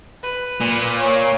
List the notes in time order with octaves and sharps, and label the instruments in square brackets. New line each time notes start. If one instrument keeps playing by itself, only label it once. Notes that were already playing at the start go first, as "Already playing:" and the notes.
[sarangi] B4
[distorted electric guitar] A#2
[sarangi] C#5